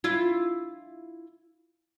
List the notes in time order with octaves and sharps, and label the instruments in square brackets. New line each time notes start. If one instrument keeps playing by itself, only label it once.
[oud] E4 F4